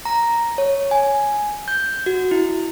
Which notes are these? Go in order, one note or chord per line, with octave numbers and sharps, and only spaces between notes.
A#5
C#5
G#5
G6
F#4
E4